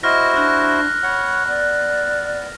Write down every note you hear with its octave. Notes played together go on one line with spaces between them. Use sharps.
E4 F#4 C5 D#5 F6 A#6
D4 F6 F#6
C#5 F#5 B5
B3 D5